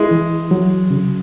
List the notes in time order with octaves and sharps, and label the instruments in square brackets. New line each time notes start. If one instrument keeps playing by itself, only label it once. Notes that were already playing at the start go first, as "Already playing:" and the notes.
Already playing: [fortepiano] G#3 [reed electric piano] E4
[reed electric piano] E3
F#3
C#3